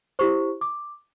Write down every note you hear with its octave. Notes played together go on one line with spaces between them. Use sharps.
E4 G4 C5 C#6
D6